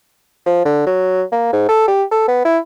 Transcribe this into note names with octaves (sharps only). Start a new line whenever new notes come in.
F3
D3
F#3
A#3
G#2
A4
G4
A4
B3
E4